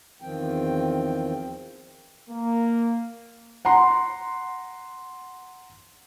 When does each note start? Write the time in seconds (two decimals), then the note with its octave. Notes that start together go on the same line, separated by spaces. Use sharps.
0.22 E2 D#3 F3 C4 G5
2.29 A#3
3.65 F#5 A#5 C6